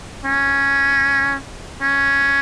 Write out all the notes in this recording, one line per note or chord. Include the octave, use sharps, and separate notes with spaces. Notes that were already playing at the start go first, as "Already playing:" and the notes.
C#4
C#4